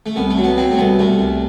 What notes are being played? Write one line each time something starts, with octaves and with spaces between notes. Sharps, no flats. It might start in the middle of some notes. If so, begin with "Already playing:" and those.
A3
C2 B3
A3
F#3
B3
F#3 C4
A3
C2 B3
C2 A3
C2